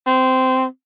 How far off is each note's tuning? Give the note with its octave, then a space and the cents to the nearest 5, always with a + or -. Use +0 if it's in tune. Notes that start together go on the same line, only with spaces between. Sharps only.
C4 -15